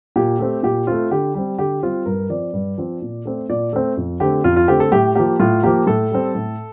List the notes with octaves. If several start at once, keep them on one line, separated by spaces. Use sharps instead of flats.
A#2 G4
A3 C4
A#2 G4
A3 C4 F4
D3 G4
G3 C4
D3 G4
G3 C4 F4
G2 A#4
F3 C4 D5
G2
F3 C4
A#2
A3 C4
A#2 D5
A3 C4
F2
D3 A3 C4 G4
F2 F4
F4
D3 A3 C4 G4
A4
A2 G4
F3 A#3 G4
A2 F4
F3 A#3 G4
A2 A4
G3 C4
A2